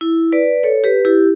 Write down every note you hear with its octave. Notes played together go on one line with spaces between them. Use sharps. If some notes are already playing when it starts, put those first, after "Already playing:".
E4
B4 D5
A4 C#5
G4 B4
E4 G4